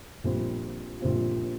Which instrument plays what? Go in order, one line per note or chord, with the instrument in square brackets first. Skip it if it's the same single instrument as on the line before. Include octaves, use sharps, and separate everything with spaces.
[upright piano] A#1 A#2 G3 C4 F4
A#1 A#2 G3 C4 F4